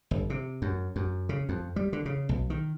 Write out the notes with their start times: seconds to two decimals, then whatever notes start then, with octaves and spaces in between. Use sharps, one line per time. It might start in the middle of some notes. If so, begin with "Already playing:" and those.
0.11 G1
0.30 C3
0.62 F#2
0.96 F#2
1.29 C#3
1.49 F2
1.76 G3
1.93 D3
2.06 C#3
2.29 B1
2.50 D#3